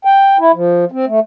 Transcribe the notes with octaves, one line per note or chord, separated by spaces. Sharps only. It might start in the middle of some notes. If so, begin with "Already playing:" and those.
G5
E4
F3
C4
A3